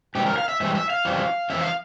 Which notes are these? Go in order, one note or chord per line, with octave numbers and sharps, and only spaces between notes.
G#2 E3 G3 G4
A#4
F5
E5
G#2 E3 G3 E5
E5
F5
F2 E3 G3
F2 E3 E5
F5